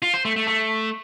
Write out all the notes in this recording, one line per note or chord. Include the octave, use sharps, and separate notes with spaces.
F4
C5
A3
A3
A3